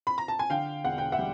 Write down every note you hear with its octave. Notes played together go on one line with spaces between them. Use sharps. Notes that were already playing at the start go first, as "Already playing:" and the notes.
B5
A#5
A5
G#5
D3 F5 G5
E1 F#5
G5
E5 F#5
G3